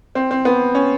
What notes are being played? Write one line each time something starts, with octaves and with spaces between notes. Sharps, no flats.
C4
C4
B3
C#4